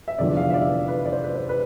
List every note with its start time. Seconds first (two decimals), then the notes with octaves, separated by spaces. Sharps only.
0.08 E5
0.19 F1 E2 D3 F3 D5
0.37 F5
0.50 E5
0.54 D5
0.88 B4
1.05 D5
1.12 C5
1.24 B4
1.34 C5
1.49 B4